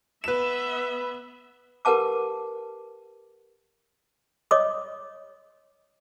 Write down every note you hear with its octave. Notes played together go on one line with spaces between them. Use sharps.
B3 B4 E5 E7
G4 A#4 B4 F#5 A5 D6
C#5 D#5 D6 D#6